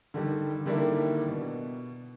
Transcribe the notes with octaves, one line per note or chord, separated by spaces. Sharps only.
D3 D#3 G3
D3 D#3 G3 A#3 D4 E4
B2